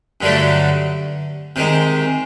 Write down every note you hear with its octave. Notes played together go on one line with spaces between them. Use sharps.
G2 D3 F#3 A3
C3 D#3 G#3